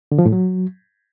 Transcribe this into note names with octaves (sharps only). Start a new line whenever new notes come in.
D3
F3
A2
F#3